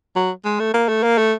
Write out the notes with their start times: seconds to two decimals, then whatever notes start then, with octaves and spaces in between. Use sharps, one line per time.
0.16 F#3
0.45 G#3
0.60 A3
0.74 A#3
0.89 A3
1.03 A#3
1.18 A3